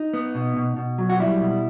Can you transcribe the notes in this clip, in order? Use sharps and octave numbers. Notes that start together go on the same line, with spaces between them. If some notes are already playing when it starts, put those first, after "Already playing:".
Already playing: D#4
B3
B2
B2
B2
F#3
F#4
G3 E4
B2